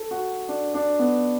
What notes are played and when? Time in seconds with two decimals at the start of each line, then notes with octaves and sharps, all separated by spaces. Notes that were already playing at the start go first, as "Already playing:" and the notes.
Already playing: A4
0.11 F#4
0.48 D4
0.74 D4
0.99 B3